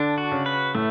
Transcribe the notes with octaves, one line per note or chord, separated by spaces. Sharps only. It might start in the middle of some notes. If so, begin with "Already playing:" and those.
Already playing: D3 D4
F#4
C#3
B4
A2 A3